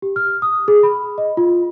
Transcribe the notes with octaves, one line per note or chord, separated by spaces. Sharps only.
G4
F6
D#6
G#4
B5
D#5
F4